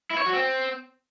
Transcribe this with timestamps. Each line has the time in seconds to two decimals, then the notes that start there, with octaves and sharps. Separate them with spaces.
0.11 E4
0.18 C#5
0.26 F#4
0.33 C4